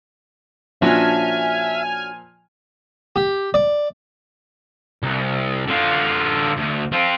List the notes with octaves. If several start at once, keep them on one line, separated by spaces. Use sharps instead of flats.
A#2 F3 C#4 D4 F#4 E5 G#5 F6
G4
D5
C2
D3 F4
D2
C4 F4